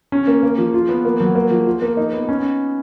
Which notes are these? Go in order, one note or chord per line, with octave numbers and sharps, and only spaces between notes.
C#4
A#3
A#3
F3
F4
B3
A#3
F#3
A#3
F3
F4
A#3
D#4
B3
C#4